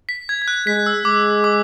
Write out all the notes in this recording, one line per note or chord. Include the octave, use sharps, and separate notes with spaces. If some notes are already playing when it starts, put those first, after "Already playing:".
B6
G#6
G#6
F#6
G#3 B6
E6
G#3 D6
D6